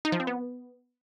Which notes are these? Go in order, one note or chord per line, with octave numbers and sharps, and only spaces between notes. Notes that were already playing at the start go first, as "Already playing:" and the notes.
D#4
F3
C4
B3